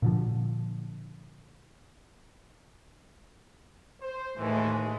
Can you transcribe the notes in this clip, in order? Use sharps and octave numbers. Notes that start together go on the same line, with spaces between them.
A#2 D3 F3
C5
D#2 A2 E3 G#3 A3